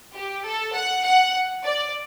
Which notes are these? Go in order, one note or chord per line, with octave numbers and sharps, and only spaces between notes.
G4
A4
F#5
F#5
D5